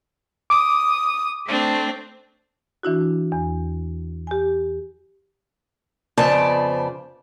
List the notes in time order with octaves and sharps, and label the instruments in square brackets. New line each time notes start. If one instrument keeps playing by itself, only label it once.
[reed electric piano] D6 [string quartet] D#6
[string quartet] A3 C4 D4
[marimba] E3 D4 E4 F#4
E2
G4 G#5
[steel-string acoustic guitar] F2 C#3 B3 C5 D5 A5